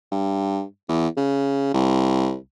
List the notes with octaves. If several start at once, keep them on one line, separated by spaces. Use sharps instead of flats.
G2
E2
C#3
C2